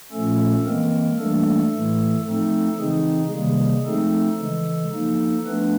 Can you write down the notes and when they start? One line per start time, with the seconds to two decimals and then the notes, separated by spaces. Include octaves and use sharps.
0.12 A#2 F3 A3 C#4 A4
0.65 E3 G#3 A#3 C4 A#4
1.19 E3 G3 A3 A#3 D4 A4
1.72 A2 E3 A3
2.26 F3 A3 C4 D#4 A4
2.79 C#3 E3 G#3 C4 D#4 G#4
3.32 C3 D#3 G3 G#3 A#3 G#4
3.86 F3 A3 C4 D#4 A4
4.39 C#3 E3 G#3
4.93 F3 A#3 D#4
5.46 F3 A3 B3 D4 B4